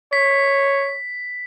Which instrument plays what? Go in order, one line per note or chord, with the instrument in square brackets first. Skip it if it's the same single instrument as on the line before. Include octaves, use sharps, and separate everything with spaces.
[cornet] C#5 [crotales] B6